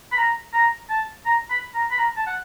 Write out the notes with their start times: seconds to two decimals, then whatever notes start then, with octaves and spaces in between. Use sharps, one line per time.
0.12 B5
0.17 A#5
0.53 A#5
0.90 A5
1.26 A#5
1.50 B5
1.74 A#5
1.91 B5
1.98 A#5
2.17 A5
2.26 F#5